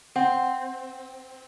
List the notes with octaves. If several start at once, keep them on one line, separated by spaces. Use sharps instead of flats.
C4 F#5